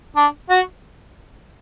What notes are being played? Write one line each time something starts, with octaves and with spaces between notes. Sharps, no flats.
D4
F#4